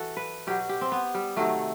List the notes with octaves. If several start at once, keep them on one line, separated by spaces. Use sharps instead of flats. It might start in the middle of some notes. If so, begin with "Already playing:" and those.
Already playing: E3 F#4 A4
B4
B2 F#3 G4
G4
C4
B3
G3
C3 D#3 F#3 A3